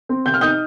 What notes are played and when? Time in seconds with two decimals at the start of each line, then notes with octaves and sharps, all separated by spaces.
0.09 C4
0.26 C3 G6
0.34 F6
0.41 D#4 D#6 G6